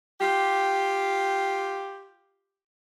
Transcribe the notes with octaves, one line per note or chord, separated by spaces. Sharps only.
F4 G4